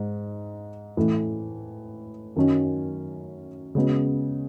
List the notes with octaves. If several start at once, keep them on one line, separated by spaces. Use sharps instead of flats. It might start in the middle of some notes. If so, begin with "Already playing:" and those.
Already playing: G#2 G#3 D#4
A2 E3 A3
F#2 D#3 F#3 C#4
C#3 G#3 B3 F#4